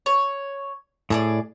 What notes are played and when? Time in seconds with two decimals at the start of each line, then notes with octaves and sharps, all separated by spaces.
0.06 C#5
1.10 A2 G#4 A4 D5